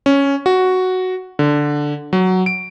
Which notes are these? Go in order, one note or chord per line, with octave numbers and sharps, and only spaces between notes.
C#4
F#4
D3
F#3
D7